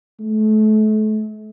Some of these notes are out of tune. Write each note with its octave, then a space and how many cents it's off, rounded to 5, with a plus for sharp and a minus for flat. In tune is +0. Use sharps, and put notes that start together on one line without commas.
A3 -35